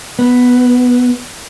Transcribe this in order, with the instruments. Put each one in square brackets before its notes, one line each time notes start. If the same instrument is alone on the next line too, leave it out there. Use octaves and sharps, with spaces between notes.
[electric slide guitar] B3